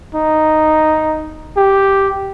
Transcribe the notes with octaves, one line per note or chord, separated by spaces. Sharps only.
D#4
G4